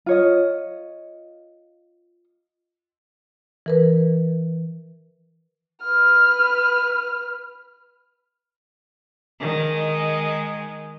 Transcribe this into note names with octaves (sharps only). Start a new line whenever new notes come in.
F4 C#5 D#5
E3 A#4 B4
B4 F6
D#3 G#3